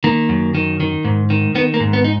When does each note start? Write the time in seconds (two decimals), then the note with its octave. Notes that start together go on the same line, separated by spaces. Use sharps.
0.04 D#3 A#3
0.29 F#2
0.55 D#3
0.80 D#3
1.05 G#2
1.30 D#3
1.55 D#3 B3
1.74 A#3
1.80 G#2
1.93 B3
2.04 D#4